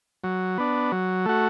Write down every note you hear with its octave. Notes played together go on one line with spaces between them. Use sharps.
F#3
B3 D4
F#3
A3 F#4